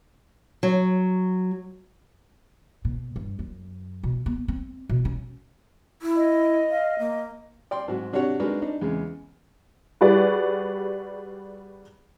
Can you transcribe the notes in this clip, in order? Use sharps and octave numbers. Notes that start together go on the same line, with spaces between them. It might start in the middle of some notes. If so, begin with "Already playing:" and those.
F#3
B2
G2
F#2
B2
B3
C4
B2
C#4
E4
D#5
F5
A#3
D5 G5 C6
G#2 F#3 F#4
C3 D4 F#4 G4 C#5 F#5
G#3 D4 D#4 F#4 A#4 B4
D4 D#4
E2 C#3 G#3
G3 F#4 G#4 B4 D5